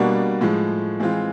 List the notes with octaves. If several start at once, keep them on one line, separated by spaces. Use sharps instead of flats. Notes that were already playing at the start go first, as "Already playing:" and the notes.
Already playing: B2 G3 A#3 D4 F#4
A2 F3 G#3
E3 G#3 C4 F4